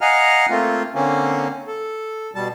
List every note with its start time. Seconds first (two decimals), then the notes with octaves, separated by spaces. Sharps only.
0.01 D#5 F5 F#5 G#5 A#5 F6
0.50 A3 A#3 C4 F4
0.94 D3 A#3 C4 C#4
1.67 A4
2.35 B2 G3 A5